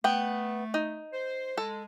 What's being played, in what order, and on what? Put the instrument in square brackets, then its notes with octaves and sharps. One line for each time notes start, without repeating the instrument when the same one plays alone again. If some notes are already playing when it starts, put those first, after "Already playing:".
[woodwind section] A3 [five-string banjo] B3 G5
[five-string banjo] D#4
[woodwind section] C5
[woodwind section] G#3 [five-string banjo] A4